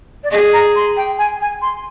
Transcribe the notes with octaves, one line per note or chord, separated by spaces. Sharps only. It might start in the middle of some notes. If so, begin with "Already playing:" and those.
D5
G#4 D#5
A#5
C6
G5
G#5
G#5
C6